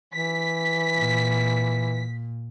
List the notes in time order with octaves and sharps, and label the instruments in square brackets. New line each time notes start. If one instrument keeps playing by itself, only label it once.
[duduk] E3 [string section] B6
[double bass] A#2